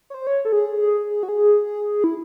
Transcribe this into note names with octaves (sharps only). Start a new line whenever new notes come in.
C#5
C5
C#5
A4
G#4
F#4
G#4
E4